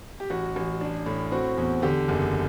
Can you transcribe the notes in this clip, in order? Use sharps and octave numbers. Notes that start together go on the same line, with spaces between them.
G4
A1 F#4
A1
D4
A2
C4 F#4
E2
D3 G4
F#1